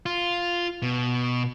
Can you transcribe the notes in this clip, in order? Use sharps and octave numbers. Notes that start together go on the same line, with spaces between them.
F4
B2